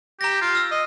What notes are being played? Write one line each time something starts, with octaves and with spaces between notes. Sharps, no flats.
G4 A#5 A#6
F4
E6 F6
D#5